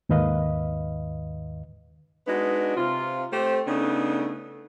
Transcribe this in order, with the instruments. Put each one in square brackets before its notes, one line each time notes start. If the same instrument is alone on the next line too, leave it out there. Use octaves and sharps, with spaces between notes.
[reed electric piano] D#2 G#2 D#3 B4 D#5 F5
[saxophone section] G#3 B3 D4 D#4 F#4
C3 F4
A3 C4 G4 C5
C#3 A3 B3 D4 D#4